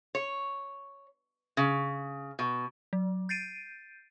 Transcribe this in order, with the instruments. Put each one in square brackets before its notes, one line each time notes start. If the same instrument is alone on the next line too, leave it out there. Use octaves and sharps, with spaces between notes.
[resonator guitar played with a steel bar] C#5
C#3
B2
[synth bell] F#3
G6 A6 C7 D7 D#7